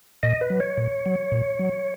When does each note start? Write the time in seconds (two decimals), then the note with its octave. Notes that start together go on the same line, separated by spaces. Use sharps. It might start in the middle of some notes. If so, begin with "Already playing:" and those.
0.23 A#2 D#5
0.41 B4
0.50 F#3
0.60 C#5
0.77 A#2
1.06 F#3
1.32 A#2
1.59 F#3